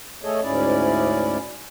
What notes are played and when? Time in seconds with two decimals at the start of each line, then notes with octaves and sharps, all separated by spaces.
0.23 A3 G#4 A4 C#5 D#5
0.42 D2 G#2 C#4 E4 G#4 D5